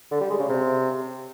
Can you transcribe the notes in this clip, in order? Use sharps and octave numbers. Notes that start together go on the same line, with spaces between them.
D3
G3
G#3
C#3
C3